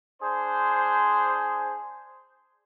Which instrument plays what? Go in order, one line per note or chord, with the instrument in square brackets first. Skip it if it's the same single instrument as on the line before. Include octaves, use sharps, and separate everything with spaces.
[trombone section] D4 G#4 C5